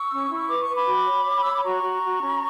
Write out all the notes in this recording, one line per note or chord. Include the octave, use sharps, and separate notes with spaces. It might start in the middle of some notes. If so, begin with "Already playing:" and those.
Already playing: C#6 E6
C#4
E4
B4 D6
C#6
B4
B5 D6
F#4
C#5
C#5
C#5 E6
D6
F#4 A#5 C#6
F#4
F#4
C#4